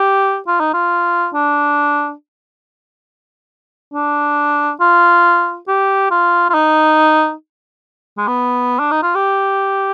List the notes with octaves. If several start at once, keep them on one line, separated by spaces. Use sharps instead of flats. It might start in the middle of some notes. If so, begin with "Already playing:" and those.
Already playing: G4
F4
D#4
F4
D4
D4
F4
G4
F4
F4
D#4
G#3
B3
D4
D#4
F4
G4